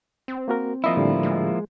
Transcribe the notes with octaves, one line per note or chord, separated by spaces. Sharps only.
C4
A#3 F#4 A#4
F3 A#3 E4 D#5 E5
A2 D3 G3
G#3